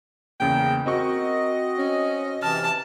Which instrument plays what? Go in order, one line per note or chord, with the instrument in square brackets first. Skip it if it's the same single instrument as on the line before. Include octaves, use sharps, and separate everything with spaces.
[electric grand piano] E2 C#3 A#3 [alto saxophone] G5
[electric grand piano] C4 F#4 C#6 [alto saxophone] A#4 [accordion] D#5
[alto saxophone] C#4
[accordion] C3 E3 [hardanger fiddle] A5 [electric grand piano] F6